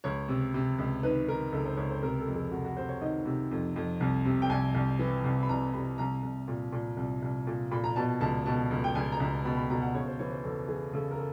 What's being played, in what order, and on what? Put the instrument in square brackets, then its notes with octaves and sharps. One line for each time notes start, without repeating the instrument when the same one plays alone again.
[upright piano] C#2 C#5
C3
C3
C#2
D#3 B4
D#3 A#4
C#2 A4
C5
C#2 C#5
C5
C3 A#4
A4
F2
G#4
C3 F#4
F#4
C3 C5
C#5
D#3 D#5
C3
F2
F2
C2
C3
G5
C2 G#5
C2
E3
C2
B5
C2 A#5
C3 B5
C2 A#5
C2
A#2
A#2
C2
C2
A#2
A#2 B5
A#5
B2 A5
C#2 A5
B2 A5
C#2
G5
C#2 G#5
A#5
C#2
B2 B5
B5
B2 A#5
F#5
C#3 C#5
C5
E3 C#5
C5
E2 A4
E3 G#4
C#3 A4
A#4
A4